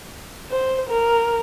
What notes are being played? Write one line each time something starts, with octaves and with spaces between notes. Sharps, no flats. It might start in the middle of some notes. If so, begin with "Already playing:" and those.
C5
A#4